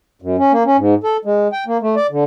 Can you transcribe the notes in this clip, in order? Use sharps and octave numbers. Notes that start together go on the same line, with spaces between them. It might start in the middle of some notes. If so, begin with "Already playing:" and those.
F#2
C#4
A#3
C#4
G#2
A4
G#3
G5
A#3
A3
D5
D3